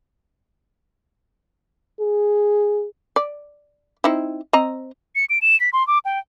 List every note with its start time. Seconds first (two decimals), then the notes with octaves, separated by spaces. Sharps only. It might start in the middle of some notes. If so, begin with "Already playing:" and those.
2.01 G#4
3.16 D5
4.04 C4 D#4 E4
4.53 C4 D#5 A#5
5.15 C#7
5.30 D7
5.42 E7
5.60 B6
5.73 C6
5.87 D6
6.05 G5